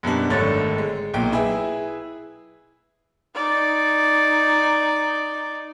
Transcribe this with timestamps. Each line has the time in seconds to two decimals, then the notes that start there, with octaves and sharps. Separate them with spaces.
0.03 F#2 B2 G3 D4
0.30 G#1 D3 A3 C#5 A6
0.78 G#3
1.14 B1 A#2 G5
1.32 E4 G#4 B4 E5
3.35 D#4 D5